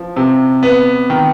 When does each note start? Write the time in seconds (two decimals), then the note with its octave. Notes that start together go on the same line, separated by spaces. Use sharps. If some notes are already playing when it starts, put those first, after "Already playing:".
Already playing: F3
0.16 C3
0.63 B3
1.10 D#3